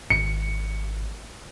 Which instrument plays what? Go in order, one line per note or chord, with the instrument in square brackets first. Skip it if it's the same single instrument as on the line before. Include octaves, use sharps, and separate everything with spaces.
[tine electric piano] G#1 [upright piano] C#7